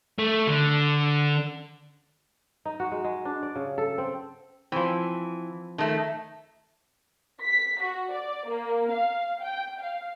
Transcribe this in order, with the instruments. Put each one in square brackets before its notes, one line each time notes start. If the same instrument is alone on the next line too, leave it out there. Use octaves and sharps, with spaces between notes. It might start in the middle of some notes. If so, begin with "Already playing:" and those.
[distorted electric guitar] A3
D3
[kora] D#4
F#4
G#3
G#3
D4
D5
C#3
A4
C4
[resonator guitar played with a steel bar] E3 [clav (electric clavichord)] F3 C4
[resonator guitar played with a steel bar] D#3 A3 [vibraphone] E5 A5
[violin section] B6
F#4
D5
A#3
F5
G5
F5